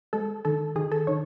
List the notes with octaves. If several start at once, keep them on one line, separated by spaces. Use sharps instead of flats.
G#3 A4
D#3 A4
D#3 G#4
A4
D#3 C#5